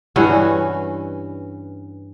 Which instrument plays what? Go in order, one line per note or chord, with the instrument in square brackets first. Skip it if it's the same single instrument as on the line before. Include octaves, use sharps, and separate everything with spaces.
[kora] G2 E3 C#4 F#4